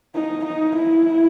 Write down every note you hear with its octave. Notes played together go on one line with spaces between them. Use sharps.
D#4
D#4
E4